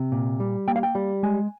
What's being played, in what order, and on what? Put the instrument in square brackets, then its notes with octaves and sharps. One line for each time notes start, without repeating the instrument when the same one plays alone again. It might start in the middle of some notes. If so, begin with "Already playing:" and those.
Already playing: [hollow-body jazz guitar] C3
A#2
G3
A#3 G5
F5
G5
G3
G#3 G#5